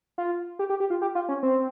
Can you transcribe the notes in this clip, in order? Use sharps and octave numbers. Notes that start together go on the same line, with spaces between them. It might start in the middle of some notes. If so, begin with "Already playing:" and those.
F4
G4
G4
G4
F4
G4
F4
C#4
C4